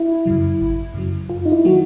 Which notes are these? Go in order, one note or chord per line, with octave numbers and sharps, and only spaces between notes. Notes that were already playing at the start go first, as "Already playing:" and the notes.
Already playing: E4
F#2 C#3 F#3
G#1
F#2 C#3 F#3
F#2 F4
D#4
E4
D#3 F#3 A#3 F#4